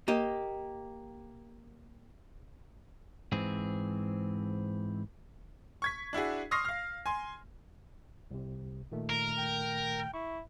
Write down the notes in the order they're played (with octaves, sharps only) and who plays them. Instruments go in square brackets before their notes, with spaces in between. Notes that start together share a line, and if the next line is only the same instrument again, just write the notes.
[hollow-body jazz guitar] A#3 G4 D#5
[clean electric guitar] G#2 E3 C4 G#4
[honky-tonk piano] C#6 G#6 B6
D4 E4 F#4 G#4
C6 C#6 D#6 F6 A#6 C7
F5 F6
G#5 C6
[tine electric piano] C2 C3
A#2 D#3 A3
[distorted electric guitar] A#4
[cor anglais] G5
[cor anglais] E4 [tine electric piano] C#6